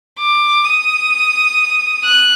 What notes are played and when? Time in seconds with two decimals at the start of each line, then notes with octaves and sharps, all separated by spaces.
0.19 D6
0.65 D#6
2.05 F#6